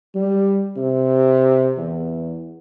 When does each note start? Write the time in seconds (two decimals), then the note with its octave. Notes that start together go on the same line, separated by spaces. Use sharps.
0.15 G3
0.77 C3
1.77 E2